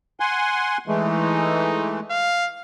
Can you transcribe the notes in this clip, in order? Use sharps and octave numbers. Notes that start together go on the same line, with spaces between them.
F#5 G#5 C6
E3 G#3 A3 D#4
F5